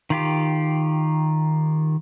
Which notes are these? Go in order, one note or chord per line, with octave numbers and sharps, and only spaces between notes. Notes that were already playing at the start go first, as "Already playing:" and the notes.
D#3 F4 G4